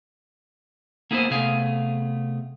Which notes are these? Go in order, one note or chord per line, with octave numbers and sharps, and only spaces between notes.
A#3 B3 E4 G#4 A#4 C5
C3 A3 B3 G#4 F5